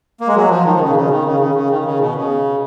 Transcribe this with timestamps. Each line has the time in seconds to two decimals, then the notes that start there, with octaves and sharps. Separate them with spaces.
0.20 A#3
0.28 G#3
0.36 F#3
0.50 F3
0.65 D#3
0.75 D#3
0.80 C#3
0.89 B2
0.95 C#3
1.10 D#3
1.25 C#3
1.40 C#3
1.55 C#3
1.70 D#3
1.85 C#3
2.00 B2
2.15 C#3